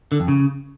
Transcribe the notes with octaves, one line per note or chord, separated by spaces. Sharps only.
D3
F2
C#3